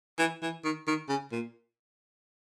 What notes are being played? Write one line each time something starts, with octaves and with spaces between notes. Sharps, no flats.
E3
E3
D#3
D#3
C#3
A#2